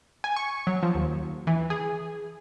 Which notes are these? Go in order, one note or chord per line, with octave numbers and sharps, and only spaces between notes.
G#5
C#6
F#3
F3
D#2
E3
G#4